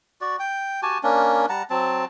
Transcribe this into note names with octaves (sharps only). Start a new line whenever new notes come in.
F#4 D5
G5
F#4 G4 G#5 A5
A#3 C#4 D4
G3 F#5 A5 A#5
F#3 C4 A5